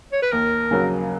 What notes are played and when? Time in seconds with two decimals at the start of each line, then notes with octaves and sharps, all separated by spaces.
0.12 C#5
0.22 B4
0.32 D#2 A#4
0.71 C#3 F#3 A#3